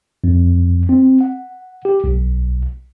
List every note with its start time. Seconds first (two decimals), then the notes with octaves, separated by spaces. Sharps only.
0.24 F2
0.89 C4
1.21 F#5
1.85 G4
2.04 B1